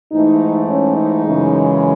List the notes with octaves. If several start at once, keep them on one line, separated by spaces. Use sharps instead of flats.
G#2 E3 A3 D#4
C#4
D#4
F#2 C#3 E3 G#3